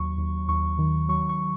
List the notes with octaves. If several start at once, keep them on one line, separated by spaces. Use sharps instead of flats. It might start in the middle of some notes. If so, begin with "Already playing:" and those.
Already playing: D#2 F#3 C#6
D#2
D#2 C#6
D#3
F#3 C#6
C#6